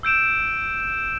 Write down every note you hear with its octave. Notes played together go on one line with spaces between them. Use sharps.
E6 G6 D7 E7